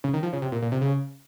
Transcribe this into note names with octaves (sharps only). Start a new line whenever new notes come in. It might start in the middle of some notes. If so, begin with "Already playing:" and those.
C#3
D#3
F3
C#3
C3
A#2
A#2
C3
C#3